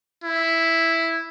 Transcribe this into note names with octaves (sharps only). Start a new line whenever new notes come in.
E4